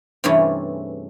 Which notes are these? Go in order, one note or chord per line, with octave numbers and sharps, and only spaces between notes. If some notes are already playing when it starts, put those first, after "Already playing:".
G2 C3 E3 A3 C#4 G#4